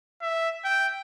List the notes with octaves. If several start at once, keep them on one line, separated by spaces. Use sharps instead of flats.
E5
G5